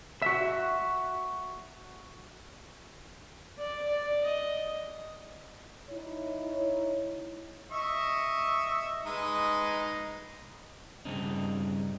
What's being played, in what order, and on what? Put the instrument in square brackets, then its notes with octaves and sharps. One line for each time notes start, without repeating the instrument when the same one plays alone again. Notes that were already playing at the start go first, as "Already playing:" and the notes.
[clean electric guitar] F#4 E5
[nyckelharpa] D5
D5
D#5
[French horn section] D#4 E4 C#5
[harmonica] D#5 E5 C#6
G#3 D#4 B4
[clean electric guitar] G2 C#3 C4 D4 D#4